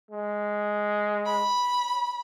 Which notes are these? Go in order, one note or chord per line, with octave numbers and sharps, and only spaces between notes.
G#3
B5